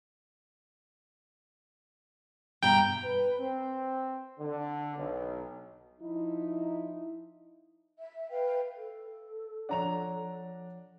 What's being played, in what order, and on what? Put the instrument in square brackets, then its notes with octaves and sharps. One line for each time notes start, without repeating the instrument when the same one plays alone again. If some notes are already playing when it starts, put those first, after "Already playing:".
[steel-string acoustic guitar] G2 B2 A#5 [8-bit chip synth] G5
[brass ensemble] B4
C4
D3
B1
[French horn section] F3 D#4 E4
[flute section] E5
B4 F5 G5
[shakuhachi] A4
[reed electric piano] F3 C#5 F#5 [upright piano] D4 A#5 F7